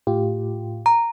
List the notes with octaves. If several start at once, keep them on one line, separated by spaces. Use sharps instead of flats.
A2 F4 G4
A#5